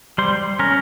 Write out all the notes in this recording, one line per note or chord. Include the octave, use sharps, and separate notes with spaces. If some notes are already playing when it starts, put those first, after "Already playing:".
G3 C5
C#4 A#4